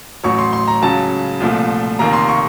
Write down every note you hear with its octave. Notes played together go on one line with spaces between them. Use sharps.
A1 A2 F#3 C#6
C6
C6
A#5
C#2 C#3 F#3 A5
C2 A#2 F3 A3
F1 D#2 D#3 A#3 A#5
C6
C#6